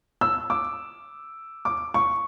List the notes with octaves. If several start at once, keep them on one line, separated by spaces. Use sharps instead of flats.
E6
D6
D6
C#6